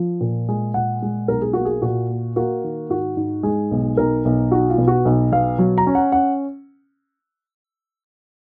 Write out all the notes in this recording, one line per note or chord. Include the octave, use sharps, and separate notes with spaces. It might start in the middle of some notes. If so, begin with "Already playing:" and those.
Already playing: F3
A#2
G#3
A#2 F#5
G#3
B1 A#4
G#4
A#3 F#4
G#4
A#2 F#4
A#3
A#3 F#4
D#3
G#2 F#4
G#2
G#3 G#4
B1
B1 A#4
B1
D#4 F#4
F4
B2
F#4
B1
B2 F5
F#3
A#5
C#4
F#5
C#4 F#5